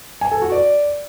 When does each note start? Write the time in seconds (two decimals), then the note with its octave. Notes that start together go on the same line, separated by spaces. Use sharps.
0.21 G#5
0.32 A4
0.42 F#4
0.52 D5